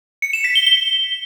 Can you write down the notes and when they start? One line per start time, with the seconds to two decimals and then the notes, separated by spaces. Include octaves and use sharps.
0.22 C#7
0.33 E7
0.44 B6
0.55 G7
0.66 G7